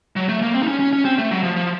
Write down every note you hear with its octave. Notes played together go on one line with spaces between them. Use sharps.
F#3
A3
A#3
C4
D#4
C#4
C#4
C#4
C4
A3
F#3
F3
F3